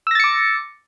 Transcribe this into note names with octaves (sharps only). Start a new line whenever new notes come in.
D6 E6 A6 A#6 C#7